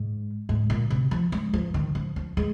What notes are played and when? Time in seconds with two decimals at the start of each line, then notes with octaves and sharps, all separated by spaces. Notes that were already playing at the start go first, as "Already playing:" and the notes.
Already playing: G#2
0.49 G#2
0.70 A#2
0.90 C3
1.11 F3
1.32 G#3
1.53 F3
1.74 D#3
1.95 F3
2.16 F3
2.37 G#3